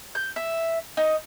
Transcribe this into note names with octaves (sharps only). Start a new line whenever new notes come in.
G6
E5
D#4